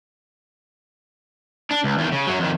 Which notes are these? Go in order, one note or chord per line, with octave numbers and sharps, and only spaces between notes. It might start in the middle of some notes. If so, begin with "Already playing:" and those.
D4
C#2
E2 D#3
C#3
F#2 F#3
F2 D#3